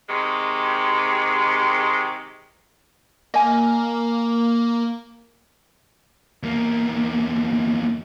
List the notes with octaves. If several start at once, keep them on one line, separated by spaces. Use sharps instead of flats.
C3 D#3 G#3
A#3 D#5 G#5
E2 A#3